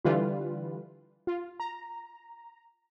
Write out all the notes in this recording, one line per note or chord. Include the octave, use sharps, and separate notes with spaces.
D3 E3 G3 F4 B4
F4
A#5